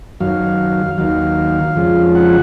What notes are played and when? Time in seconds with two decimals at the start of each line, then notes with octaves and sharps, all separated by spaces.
0.20 F#2 D#3 F#3 F5
0.98 D#2 D#3 F#3 F5
1.75 F2 C#3 F3 G#3
2.15 F#5